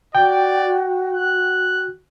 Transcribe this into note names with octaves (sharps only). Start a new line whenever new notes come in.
F#4 D5 G5
F#6